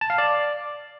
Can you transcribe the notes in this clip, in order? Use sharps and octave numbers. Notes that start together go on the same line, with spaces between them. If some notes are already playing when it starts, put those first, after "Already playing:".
A5
F5
D5